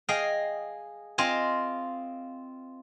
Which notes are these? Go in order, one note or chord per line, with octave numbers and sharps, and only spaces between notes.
G#4 D#5 F5 G5
C4 F4 D#5 G#5